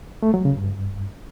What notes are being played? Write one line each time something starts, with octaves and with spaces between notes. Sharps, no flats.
A3
F#3
C#3
G2